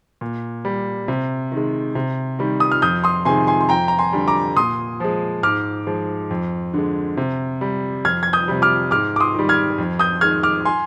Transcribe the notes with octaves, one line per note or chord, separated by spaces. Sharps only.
A#2
G3
C3
D#3 G#3
C3
D#3 G3
D#6
F6
F2 D#6 G6
C6 D#6
C3 D#3 G#3 G#5 C6
G#5 C6
C6
F2 G5 A#5
A#5
G#5 C6
D3 G3
A#5 D6
A#2 C6 D#6
F3 G#3
G#2 D6 F6
F3 G#3
F2
D3 G#3
C3
G3
F2 F6 G#6
G#6
D#6 G6
C3 G3
D6 F6
G#2 D6 F6
D6
C6 D#6
D#3 G3
F6 G#6
F2
D#6 G6
D#3 G#3 F6 G#6
D6 F6
G#5 C6